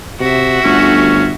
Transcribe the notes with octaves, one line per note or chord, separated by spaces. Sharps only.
C3 F#4 E5
G1 D2 C#4